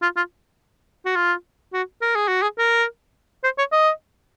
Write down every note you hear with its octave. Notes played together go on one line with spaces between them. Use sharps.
F4
F4
F#4
F4
F#4
A#4
G#4
F#4
G#4
A#4
C5
C#5
D#5